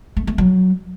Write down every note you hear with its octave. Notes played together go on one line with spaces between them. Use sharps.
A3
A3
F#3